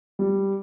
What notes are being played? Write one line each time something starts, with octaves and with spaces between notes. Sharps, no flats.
G3